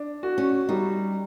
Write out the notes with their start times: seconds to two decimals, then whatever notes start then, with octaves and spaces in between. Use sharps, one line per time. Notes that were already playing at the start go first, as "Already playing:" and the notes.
Already playing: D4
0.23 F#4
0.38 C#4
0.69 G3 D#4